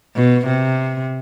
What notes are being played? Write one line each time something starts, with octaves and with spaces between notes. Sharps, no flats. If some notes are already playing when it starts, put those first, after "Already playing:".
B2
C3